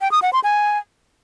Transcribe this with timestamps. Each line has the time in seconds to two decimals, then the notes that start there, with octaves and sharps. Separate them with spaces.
0.01 G5
0.12 D#6
0.22 F#5
0.33 C6
0.44 G#5